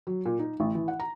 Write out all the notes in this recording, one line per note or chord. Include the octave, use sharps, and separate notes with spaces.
F#3
A#2
D#4
A1
E3
F#5
A#5